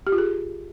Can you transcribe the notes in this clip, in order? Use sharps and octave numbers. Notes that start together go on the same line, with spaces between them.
G4
F4
G#4